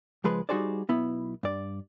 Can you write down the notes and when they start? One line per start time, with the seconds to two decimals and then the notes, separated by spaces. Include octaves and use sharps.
0.24 C#2 F3 G#3 B4
0.49 G3 D#4 F#4 G#4 C5 D5
0.89 B1 B3 E4
1.43 G2 D5